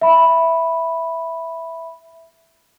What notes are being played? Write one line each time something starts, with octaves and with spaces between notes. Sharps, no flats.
E5 B5